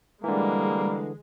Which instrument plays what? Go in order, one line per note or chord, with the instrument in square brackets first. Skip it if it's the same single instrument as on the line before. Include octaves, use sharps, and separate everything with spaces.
[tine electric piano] D3 E3 [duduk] G3 [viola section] G#3 [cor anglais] A#3